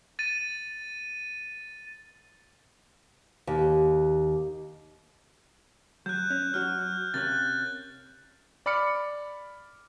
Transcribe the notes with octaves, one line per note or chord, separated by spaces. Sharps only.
A6 D#7
D#2
F#3 F#6 G6
C#4
F#3 F#4 C#5 F6
C3 A#3 C#4 F#6 A6
D5 B5 D6 F6 C#7